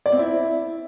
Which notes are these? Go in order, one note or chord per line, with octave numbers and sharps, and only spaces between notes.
D5
C4
E4